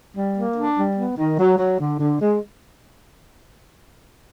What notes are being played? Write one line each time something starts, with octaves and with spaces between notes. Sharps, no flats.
G3
A#3
D4
G3
B3
D#3
F#3
F#3
D3
D3
G#3